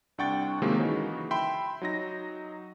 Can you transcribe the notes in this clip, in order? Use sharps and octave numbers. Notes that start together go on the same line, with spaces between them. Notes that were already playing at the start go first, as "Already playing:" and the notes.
C2 D4 F#5 G5 C#6 A6
C3 D#3 F#3 G#3 A#3
C#3 E3 D#4 F#4
E5 G5 B5 C6
F#3 D#4 A#6